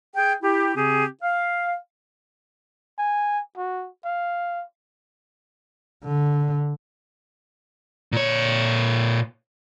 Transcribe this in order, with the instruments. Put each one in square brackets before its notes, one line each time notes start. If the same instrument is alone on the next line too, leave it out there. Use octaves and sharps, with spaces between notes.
[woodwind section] G#4 G5
E4 G4
C#3 C4 G4 G#4
F5
[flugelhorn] G#5
F#4
F5
[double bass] D3
[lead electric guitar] A#2 C#5